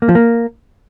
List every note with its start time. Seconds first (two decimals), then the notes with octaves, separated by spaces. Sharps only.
0.02 A#3
0.09 F3
0.15 A#3